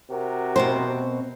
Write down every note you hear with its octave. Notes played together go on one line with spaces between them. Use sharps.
C3 F#4 A#4
B2 C4 C5